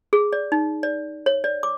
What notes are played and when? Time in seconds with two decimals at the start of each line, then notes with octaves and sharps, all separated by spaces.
0.13 G#4
0.33 D5
0.52 D#4
0.83 D5
1.26 C#5
1.44 D5
1.63 D6